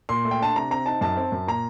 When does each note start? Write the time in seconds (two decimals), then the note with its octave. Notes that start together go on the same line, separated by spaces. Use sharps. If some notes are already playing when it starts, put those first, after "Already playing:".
0.09 A#2 C6
0.25 A3
0.31 G5
0.41 D4 A5
0.56 C3 A#5
0.71 C4 A#5
0.86 D#4 A5
1.01 F#2 A5
1.17 C4
1.32 F#2
1.47 A#2 A#5